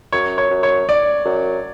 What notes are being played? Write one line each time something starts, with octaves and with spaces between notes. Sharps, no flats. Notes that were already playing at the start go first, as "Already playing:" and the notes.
F#2 C#5
C#5
F#2
C#5
D5
F#2